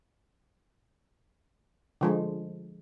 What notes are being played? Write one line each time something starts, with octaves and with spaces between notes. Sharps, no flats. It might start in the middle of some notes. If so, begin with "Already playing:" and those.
D3 F3 G#3